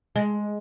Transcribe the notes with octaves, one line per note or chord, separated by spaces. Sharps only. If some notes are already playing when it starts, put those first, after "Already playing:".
G#3